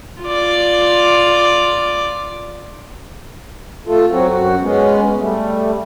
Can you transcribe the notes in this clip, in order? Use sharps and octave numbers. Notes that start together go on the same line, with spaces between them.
F4 D5
A3 F4 A4
F#3 C4 F#4
F#2 F#4
G#3 B3 C#4
G3 A3